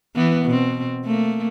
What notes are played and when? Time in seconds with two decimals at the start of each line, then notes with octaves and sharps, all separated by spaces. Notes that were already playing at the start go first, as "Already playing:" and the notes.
0.16 E3 B3
0.46 B2 C4
1.05 A3 A#3